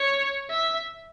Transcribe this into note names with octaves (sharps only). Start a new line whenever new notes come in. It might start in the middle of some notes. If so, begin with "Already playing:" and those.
Already playing: C#5
E5